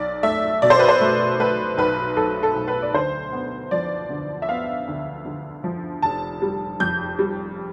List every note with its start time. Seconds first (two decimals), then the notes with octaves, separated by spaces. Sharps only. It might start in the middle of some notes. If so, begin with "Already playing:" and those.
Already playing: B1 D5
0.23 A3 E5
0.62 B2 D5
0.70 C5
0.79 B4
0.88 C5
1.01 A3
1.39 A3 B4
1.78 B1 B4
2.17 B1 A4
2.43 A4
2.55 B1
2.68 B4
2.82 D5
2.93 D2 C5
3.32 B3
3.71 F3 D5
4.10 D3
4.42 E5
4.48 B3 F5
4.88 D2
5.25 D3
5.64 F3
6.02 F1 A5
6.42 G3
6.80 F2 G6
7.19 G3